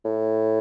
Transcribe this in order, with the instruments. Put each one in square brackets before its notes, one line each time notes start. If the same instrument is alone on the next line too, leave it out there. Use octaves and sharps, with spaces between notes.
[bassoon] A2